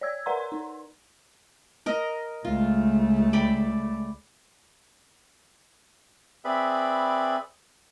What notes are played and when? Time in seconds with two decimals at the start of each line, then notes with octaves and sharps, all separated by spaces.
0.01 C#5 D5 E6 G#6
0.26 A#4 B4 D5 F#5 A#5 C6
0.37 C6
0.52 D#4
1.86 A#4 D#5
2.45 C#2 A3 F4
3.33 D5 G5 B5
6.45 C4 G#4 B4 D5 E5 B5